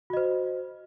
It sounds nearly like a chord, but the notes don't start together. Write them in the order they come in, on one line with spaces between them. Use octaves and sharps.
F#4 D#5 C5